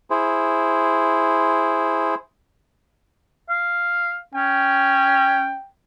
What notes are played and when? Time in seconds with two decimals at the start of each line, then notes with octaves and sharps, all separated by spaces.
0.10 E4 G#4 C5
3.49 F5
4.34 C#4 G5